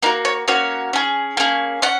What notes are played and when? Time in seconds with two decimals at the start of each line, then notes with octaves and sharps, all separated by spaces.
0.02 A#3 D#4 F#4 A#4
0.25 C#5
0.48 A#3 C#4 F#4 C#5
0.93 C#4 G#4
1.37 A#3 C#4 G#4
1.82 C#4 F#5